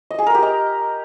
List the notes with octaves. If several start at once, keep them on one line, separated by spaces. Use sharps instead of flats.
D#5
G#4
A#4
G4
D#5